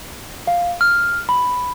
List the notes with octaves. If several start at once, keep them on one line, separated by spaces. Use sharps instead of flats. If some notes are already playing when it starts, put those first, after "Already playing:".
F5
F6
B5